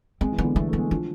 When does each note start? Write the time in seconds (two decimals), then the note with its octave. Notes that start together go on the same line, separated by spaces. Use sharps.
0.21 G#3 C4
0.32 E3
0.38 B3
0.44 D3
0.56 E3 A3
0.68 A3
0.73 B3
0.79 G#3
0.90 F3 D4